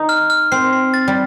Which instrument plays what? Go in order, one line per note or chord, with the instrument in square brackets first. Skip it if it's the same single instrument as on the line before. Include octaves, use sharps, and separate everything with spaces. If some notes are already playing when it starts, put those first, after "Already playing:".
Already playing: [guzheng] D#4
[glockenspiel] F6
F6
[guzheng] C4 [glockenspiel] C7
[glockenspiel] C7
A6
[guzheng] G3